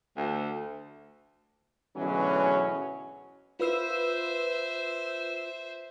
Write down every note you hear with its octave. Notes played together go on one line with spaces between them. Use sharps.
D2
D2 B2 E3 F#3 C#4 G#4
F4 B4 C5 E5 E6